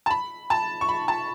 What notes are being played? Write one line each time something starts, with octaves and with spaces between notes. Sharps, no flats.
A5
B5
A5
C#6
B5
A5